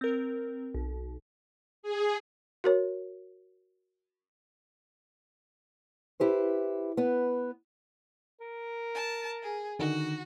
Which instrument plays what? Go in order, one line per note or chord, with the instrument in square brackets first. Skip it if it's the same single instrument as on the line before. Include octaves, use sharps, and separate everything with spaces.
[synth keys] C4 A#4
B1
[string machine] G#4
[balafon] F#4 A#4 C#5
[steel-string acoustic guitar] E4 G4 B4 C5
B3 B4
[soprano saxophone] A#4
[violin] A5
G#4
[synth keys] D3 D#3 D#4 [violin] F#4